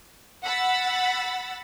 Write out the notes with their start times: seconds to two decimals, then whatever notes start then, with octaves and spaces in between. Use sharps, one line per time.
0.44 F#5 B5 E6 A6